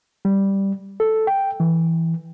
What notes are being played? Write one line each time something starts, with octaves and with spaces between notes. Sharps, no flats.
G3
A4
G5
E3